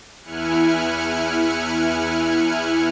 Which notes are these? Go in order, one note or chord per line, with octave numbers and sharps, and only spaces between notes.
E2 E4 G#5 F6 F#6 C#7